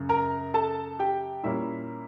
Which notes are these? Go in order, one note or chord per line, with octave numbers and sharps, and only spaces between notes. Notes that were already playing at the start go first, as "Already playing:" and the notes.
Already playing: F#2 C#3
A#4 A#5
A4 A5
G4 G5
A#2 G3 A#3 C#4 E4 E5